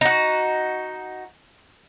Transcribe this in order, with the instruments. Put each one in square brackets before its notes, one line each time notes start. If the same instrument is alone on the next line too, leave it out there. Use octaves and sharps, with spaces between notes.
[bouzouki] D#4 F#4